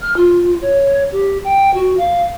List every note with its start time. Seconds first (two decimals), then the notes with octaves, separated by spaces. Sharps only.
0.01 F6
0.17 F4
0.62 C#5
1.12 G4
1.44 G5
1.74 F#4
1.97 F5